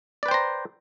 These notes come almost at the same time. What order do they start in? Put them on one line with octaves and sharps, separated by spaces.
D5 B4 G5 C5 A#5